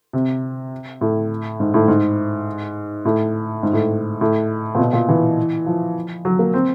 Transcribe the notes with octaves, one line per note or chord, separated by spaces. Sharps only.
C3
A2
G#2
A2
G#2
A2
G#2
A2
A2
A#2
B2
A#2
E3
F3
F#3
A#3
C4